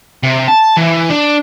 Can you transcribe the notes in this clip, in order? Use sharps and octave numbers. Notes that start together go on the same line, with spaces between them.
C3
A5
E3
D4